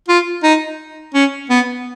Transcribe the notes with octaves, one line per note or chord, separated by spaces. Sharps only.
F4
D#4
C#4
B3